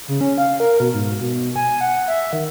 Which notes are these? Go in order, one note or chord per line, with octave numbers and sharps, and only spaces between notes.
C#3
C#4
F5
A#4
B2
G#2
B2
G#5
F#5
E5
D#3